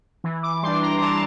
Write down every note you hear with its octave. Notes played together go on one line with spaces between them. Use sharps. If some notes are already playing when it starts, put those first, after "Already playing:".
E3
D6
G3 D4 C6
A#5
E3 A5